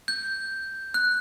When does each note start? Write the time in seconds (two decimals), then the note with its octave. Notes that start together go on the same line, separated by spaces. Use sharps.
0.08 G6
0.94 F#6